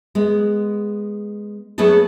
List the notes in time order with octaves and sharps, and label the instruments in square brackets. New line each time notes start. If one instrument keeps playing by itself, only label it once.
[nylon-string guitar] G#3 B3
F#3 A3 B3 G#4 A4